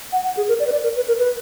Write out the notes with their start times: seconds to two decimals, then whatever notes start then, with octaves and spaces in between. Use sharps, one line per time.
0.12 F#5
0.24 F#5
0.37 G#4
0.48 A#4
0.60 D5
0.67 B4
0.72 D5
0.83 A#4
0.96 B4
1.08 A#4
1.19 B4